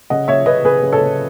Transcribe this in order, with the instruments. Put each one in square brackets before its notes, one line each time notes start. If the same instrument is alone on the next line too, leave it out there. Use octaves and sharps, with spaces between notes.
[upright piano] C#3 D#5 F#5
C#3 C#5 E5
C#3 B4 D#5
C#3 G#4 B4
C#3
A4 C#5
C#3